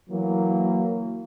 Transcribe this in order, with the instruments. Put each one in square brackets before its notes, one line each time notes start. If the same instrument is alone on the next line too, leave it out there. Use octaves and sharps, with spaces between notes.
[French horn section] E3 F#3 A#3